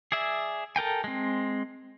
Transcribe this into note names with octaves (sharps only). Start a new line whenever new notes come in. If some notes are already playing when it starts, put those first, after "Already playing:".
G#4 D5 E5 G#5
A4 A#4 G5 G#5
G#3 C4